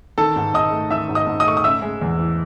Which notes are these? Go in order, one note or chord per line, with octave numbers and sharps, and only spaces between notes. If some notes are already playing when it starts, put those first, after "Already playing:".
D#3 A4 A5
G#2
G#2 D#5 D#6
A3
D#3 E5 E6
G#2
D#5 D#6
G#2
D#5 D#6
A3 C#6
D#6
C#3 E5 E6
G#3
E2
E3